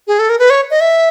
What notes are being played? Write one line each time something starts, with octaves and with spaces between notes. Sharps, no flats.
G#4
A4
A#4
B4
C#5
D#5
E5